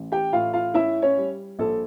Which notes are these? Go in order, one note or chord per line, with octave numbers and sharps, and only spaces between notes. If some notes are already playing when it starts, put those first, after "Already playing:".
Already playing: A1
G4 G5
A2 F4 F5
F4 F5
C#4 E4 E5
C#4 C#5
G3
A#1 A4